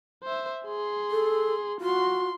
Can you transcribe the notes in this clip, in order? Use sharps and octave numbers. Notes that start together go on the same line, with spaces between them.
C5 E5
G#4 C6
A4
F4 F#4 C6